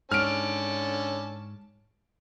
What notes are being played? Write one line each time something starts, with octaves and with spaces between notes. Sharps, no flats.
G#2 D3 C#4 A5 F6 D7